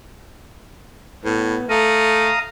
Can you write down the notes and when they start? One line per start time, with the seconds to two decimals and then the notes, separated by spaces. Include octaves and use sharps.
1.25 A2 B3
1.69 A3 F5 A#5 D#6